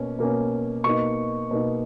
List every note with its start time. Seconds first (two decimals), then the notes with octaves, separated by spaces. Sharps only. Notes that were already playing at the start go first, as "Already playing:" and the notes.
Already playing: B2 A#3 C#4
0.19 B2 A#3 C#4
0.84 B2 A#3 D#4 C#6
1.51 B2 A#3 D#4